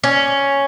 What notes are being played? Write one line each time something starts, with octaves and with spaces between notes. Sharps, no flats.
C#4